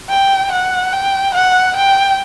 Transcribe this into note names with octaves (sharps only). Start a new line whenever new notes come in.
G5
F#5
G5
F#5
G5